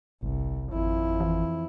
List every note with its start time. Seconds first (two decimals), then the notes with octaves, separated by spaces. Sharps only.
0.23 G1 C2
0.73 G#1 F2 E4
1.20 E3